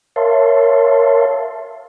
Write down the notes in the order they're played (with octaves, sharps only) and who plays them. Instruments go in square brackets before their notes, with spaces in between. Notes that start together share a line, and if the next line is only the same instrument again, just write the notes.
[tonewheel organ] A#4 C#5 E5 F5 A5 C6